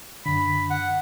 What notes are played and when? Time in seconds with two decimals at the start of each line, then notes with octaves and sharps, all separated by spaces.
0.26 F#2 D3 B5
0.70 F#5